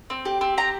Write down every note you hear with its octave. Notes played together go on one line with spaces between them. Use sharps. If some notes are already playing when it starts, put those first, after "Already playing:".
C4
G4
C4
G4 A#5